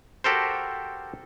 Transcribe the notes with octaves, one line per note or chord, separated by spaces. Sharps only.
F#4 G4 A4 A#4 C5